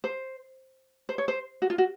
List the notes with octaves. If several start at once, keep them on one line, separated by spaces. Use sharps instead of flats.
C5
C5
C#5
C5
F#4
F4
F#4